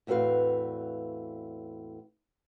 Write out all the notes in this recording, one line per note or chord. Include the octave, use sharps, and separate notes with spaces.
E2 A2 C4 F#4 B4 F5